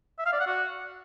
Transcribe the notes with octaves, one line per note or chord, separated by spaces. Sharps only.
E5
F5
D5
F#5
F#4